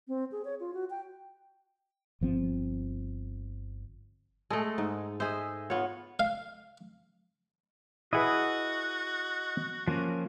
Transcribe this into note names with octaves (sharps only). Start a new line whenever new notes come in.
C4
G#4
C#5
F4
F#4
G5
G1 F3 C4
G#3 A3 G#4 A4
G#2 D#4
G#4 C5 D#5 E5
B3 F4 C#5
F5
E4 F#4 G#4 B4 D#5 F#5
F3 A#3 C#4